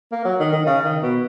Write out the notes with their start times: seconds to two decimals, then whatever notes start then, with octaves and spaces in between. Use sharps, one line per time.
0.12 A#3
0.25 F#3
0.39 D#3
0.53 D#3
0.66 C#3
0.84 D#3
1.02 B2